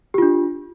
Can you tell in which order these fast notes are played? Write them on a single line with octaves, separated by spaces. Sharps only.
G4 F4 D4